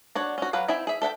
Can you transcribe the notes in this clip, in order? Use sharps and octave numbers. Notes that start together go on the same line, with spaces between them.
D4 F#4 C#5
C#4 F#4
F#3 B4 F5 F#5
C4 E4 E5 G#5
G#4 E5
A4 E5 F#5 G5